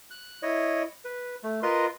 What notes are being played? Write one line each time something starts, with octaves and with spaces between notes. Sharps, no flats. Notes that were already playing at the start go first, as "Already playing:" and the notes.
F#6
E4 C#5 D#5
B4
A3
F4 A#4 B4 D#5 C6